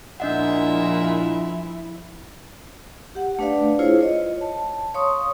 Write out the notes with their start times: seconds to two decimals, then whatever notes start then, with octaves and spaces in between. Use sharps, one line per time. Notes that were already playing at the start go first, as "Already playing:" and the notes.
0.20 A#2 F3 G#3 D4 E4 D#5 E5 F#5
3.15 G4 F#5
3.39 A3 D4 B4 D5 F5
3.79 E4 F4 G#4 C5 C#5
4.01 C#5 D#5
4.41 A5
4.94 C#5 F5 C6 C#6 D#6